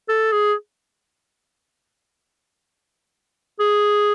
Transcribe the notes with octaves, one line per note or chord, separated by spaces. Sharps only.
A4
G#4
G#4